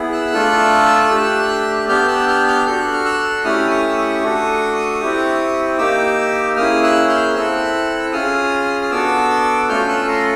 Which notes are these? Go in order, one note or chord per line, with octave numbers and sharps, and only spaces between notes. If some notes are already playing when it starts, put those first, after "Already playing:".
Already playing: B3 E4 G#4
E6 F#6
A3 D4 F4 A4
A3 D4 G4
B3 D4 G4 F6 G6
E6 F#6
F6 G6
F6 G6
D4 F#4 A4 G6
F#6
F6
E6 F#6
A3 C#4 E4 G4 D#6 F6
C#6 D#6
E6
C#6 D#6
A3 D4 F#4 A4
C4 E4 G4
A#3 D#4 G4 D6 E6
A#3 C#4 E4 G#4 D#6 F6
E6 F#6
F6 G6
C4 E4 A4 E6 F#6
C#4 F4 G#4 D#6 F6
F6
B3 D4 F#4 A4 D6 E6
A3 C#4 F4 A4 F6 G6
E6 F#6
A#5 C6